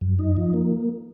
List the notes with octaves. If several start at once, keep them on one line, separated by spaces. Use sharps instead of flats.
F#2
D#4
F3
A#3